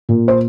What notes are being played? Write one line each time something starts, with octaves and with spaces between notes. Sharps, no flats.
A#2
C5